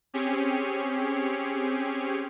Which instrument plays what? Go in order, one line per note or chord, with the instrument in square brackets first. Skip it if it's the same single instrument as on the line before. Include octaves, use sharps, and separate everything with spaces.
[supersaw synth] C4 C#4 G4 G#4 C#5